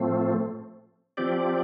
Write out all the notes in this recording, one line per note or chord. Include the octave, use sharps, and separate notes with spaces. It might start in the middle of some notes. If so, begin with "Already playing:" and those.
Already playing: A2 F3 A3 C4
F3 C4 G4 D5